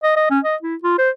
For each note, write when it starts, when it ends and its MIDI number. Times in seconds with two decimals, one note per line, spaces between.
0.03 0.12 75
0.16 0.28 75
0.30 0.39 61
0.44 0.56 75
0.62 0.75 64
0.84 0.97 65
0.98 1.10 72